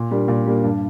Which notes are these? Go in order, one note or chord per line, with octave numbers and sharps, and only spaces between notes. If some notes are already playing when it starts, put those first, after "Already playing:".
Already playing: A#2
G3 A#3 D4
A#2
G3 A#3 D4
G2